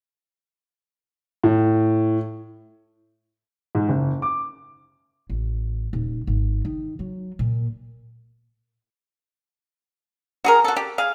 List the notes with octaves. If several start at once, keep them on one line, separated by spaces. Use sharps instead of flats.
A2
G#2
F#1
D6
A1
D#1
G#1
D#3
F#3
A#2
F#4 G#4 A#4
F#4 A4
G4
G#4 F5